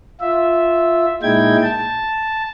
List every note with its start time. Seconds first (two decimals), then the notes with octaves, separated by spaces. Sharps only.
0.20 F4 E5
1.23 A#2 G#3 D#4 E4 G5 G#6
1.62 A5